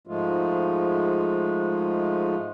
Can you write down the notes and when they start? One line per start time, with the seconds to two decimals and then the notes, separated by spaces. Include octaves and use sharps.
0.07 G#2 F3 G#3 A3 F4